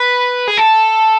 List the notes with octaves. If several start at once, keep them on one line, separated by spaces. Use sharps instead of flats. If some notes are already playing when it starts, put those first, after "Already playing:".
Already playing: B4
G#4
A4